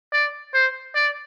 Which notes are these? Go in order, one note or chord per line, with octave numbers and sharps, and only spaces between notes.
D5
C5
D5